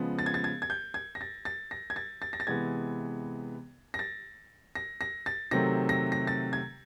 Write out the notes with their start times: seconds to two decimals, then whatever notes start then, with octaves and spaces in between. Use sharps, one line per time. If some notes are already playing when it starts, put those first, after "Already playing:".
Already playing: C#3 F3 G#3 B3
0.19 A6
0.26 G#6
0.34 A6
0.44 G#6
0.62 G#6
0.70 G6
0.94 G#6
1.15 A#6
1.21 A6
1.45 A6
1.71 A#6
1.90 G#6
1.96 A6
2.22 A6
2.33 A#6
2.40 A6
2.47 C3 E3 G#3 B3 G#6
3.94 A#6
3.99 A6
4.75 A#6
5.01 A#6
5.26 A6
5.51 C3 D#3 F#3 A3 C4 A#6
5.89 A#6
6.12 A#6
6.27 A6
6.53 G#6